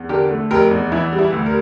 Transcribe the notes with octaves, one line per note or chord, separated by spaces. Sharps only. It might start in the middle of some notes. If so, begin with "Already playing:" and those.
Already playing: E2
D3 G4 A#4
A3
F1 G4 A#4
E2
E3 E4
G3
E4
D2
A#4